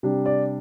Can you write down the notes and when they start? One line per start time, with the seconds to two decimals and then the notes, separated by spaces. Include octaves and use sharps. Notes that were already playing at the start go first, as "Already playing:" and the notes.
0.03 C3 G3 D4
0.26 D5